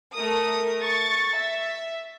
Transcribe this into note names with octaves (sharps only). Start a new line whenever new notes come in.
A3 A#4 D#6
C#6 A6
E5